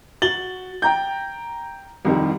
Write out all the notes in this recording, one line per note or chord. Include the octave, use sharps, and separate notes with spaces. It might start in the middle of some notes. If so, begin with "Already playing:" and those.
F#4 A6 F#7 G7
G5 A#5 G6
C2 F2 D#3 G3